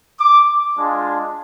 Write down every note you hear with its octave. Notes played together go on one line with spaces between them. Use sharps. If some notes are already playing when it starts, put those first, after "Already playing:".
D6
G#3 D4 F4